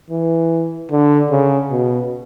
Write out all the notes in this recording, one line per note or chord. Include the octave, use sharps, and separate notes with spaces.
E3
D3
C#3
B2